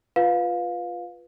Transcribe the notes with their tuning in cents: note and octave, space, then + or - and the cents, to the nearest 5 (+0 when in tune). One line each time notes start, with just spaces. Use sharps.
F4 +0 B4 +0 F5 +15